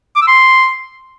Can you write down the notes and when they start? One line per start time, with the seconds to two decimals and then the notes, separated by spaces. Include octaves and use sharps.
0.16 D6
0.22 E6
0.28 C6